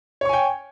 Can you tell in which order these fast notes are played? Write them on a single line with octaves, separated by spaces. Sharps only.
C#5 C#6 G#5 G5